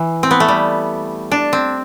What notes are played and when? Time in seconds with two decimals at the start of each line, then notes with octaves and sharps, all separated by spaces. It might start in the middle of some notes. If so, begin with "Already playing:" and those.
Already playing: E3
0.23 C4
0.31 B3
0.40 A3
0.48 G3
1.32 D4
1.53 C4